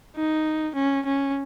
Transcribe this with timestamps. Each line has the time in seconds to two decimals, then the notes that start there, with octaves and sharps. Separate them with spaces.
0.16 D#4
0.75 C#4
1.06 C#4